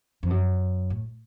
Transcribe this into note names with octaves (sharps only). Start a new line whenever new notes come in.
F2
F#2
A2